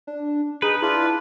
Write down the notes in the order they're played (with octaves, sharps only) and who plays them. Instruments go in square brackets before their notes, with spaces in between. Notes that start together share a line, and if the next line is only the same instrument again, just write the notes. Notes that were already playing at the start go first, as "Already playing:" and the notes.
[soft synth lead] D4
[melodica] D#4 [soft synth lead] G#4 [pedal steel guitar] B4
[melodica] D4 F4 [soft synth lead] E4